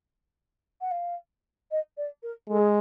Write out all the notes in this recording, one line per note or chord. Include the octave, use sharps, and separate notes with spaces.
F#5
F5
D#5
D5
A#4
G#3 A4
G#4